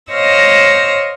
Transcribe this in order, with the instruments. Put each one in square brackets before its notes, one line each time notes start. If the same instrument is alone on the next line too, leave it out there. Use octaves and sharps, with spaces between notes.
[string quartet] C5 C#5 D#5 F5 E6 A#6